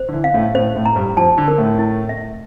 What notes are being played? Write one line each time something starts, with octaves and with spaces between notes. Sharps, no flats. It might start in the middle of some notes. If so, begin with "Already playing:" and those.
Already playing: C5
D3
E3
F5
A2 A3
A2 A3 C5
A2 A3
A#5
G2 G3
F2 F3 A5
D3
A#4
A2 A3
E4
E5